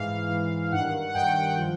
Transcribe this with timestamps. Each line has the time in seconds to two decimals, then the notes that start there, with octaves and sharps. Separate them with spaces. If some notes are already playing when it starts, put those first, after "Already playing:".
Already playing: G#2 E3 F5
0.30 G#2 E3
0.72 G2 D#3 F#5
1.09 F#5
1.15 G2 D#3 G5
1.57 F3